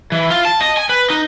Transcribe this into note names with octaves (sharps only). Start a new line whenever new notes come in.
E3
F4
A5
D#5
G#5
B4
D#4